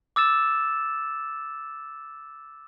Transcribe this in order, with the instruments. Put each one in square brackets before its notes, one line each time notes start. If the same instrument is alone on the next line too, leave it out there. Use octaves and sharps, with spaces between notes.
[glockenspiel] D6 E6 A6 E7